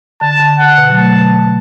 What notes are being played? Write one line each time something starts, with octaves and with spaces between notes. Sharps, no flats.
D3 A5
D3
F#5
B2
F#3
A3 A5